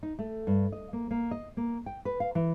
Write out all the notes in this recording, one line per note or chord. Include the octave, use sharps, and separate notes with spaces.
D#4
A3
G2
D#5
A#3
A#3
D#5
A#3
G5
B4
F5
E3